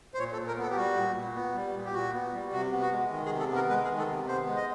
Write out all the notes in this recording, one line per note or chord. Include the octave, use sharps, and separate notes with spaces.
C5
A#2 C#5
A4
A#2
A#4
B3 A4
G4
G3 F#4
A#2
A#2
B3
G3
A#2
G4
A#2 F#4
B3
G3
C3 F#4
B3
F#4
G#3
D#3
G#4
C3
A4
B3
A#4
G#3 B4
G#4
D#3
A4
C3
B3 C5
G#3
D#5